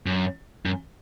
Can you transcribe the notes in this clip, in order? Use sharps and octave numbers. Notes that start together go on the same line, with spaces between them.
F#2
F#2